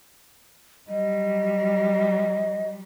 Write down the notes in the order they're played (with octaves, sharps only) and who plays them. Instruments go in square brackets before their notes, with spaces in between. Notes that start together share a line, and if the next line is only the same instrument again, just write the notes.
[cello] F#3 G3 [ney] D#5